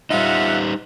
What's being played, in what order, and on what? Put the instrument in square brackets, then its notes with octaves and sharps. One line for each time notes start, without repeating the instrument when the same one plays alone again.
[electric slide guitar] G3 D#4 [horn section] F4 E5 F#5